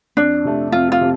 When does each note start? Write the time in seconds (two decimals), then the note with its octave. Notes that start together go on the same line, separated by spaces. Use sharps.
0.17 F2 D4
0.45 C3 A3
0.72 F2 F4
0.92 F4
1.01 C3